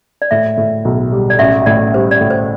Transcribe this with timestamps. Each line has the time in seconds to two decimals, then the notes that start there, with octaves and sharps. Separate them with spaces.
0.22 D5
0.31 A2 E5
0.57 A2
0.85 B1
1.12 G3
1.30 D5
1.39 A1 E5
1.66 A2 D5
1.94 G3 C5
2.11 D5
2.21 A2
2.30 C5